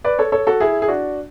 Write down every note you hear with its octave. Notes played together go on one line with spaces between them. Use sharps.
B4 D5
A4 C#5
A4 C#5
F#4 A4
E4 G#4
G#4
D4 F#4